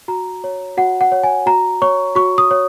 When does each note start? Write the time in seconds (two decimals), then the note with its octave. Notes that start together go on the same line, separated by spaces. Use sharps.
0.08 F#4 A#5
0.44 C#5
0.77 F#4 F#5
1.01 F#5
1.12 C#5
1.23 G#5
1.46 F#4 A#5
1.82 C#5 C#6
2.15 F#4 C#6
2.38 D#6
2.51 C#5